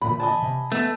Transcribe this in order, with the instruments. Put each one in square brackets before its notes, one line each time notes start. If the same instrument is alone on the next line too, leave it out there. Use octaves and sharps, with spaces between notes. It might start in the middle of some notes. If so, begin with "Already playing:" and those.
[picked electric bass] D2 A#2 E3 [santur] B5
[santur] D#5 G#5 A5
[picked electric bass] C3
[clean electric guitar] A3 [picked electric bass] B3